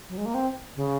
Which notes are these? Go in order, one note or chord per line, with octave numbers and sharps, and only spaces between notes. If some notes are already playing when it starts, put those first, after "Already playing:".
F#3
G#3
A#3
C4
C#3